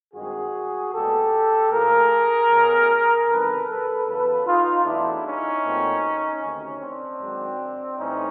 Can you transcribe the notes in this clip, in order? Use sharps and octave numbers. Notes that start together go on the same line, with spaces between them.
G2 D#3 G#3 C4 F#4 G#4
C#2 B2 G3 A#3 G4 A4
A2 F3 A#3 G#4 A#4
B2 F#3 A3
E2 C3 D#3 G3 A4 B4
A4 B4
E2 C#3 F#3 A4 B4
D#4 F4
E2 B2 F#3 A3 D4 E4
C#4 D#4
A#2 F#3 A3 C4
D2 C3 D#3 C#4
C4 D4
G#2 D#3 F#3
A2 E3 G3 C4 C#4 D#4